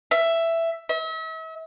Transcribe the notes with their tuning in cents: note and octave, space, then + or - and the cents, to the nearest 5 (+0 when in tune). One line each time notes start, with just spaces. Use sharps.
E5 +10
E5 -40